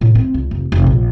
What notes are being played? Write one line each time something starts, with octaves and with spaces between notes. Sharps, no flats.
A2
C4
C#2
F1
F1
A#1